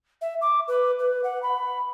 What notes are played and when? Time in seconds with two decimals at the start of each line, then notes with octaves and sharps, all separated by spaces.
0.21 E5
0.41 D6
0.68 B4
0.99 B4
1.24 F#5
1.42 B5